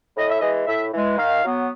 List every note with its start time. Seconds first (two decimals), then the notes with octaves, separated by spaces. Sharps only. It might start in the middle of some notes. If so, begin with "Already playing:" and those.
0.16 A2 D#5
0.29 E5
0.41 E3 G#3 D#5
0.67 A2 E5
0.93 E3 G#3
1.18 D#3 F5
1.44 F#3 B3